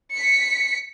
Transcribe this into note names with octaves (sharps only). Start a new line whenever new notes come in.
B6 C#7